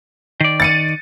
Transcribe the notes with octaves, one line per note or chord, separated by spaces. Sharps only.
D#3 D5
A6 C#7 D#7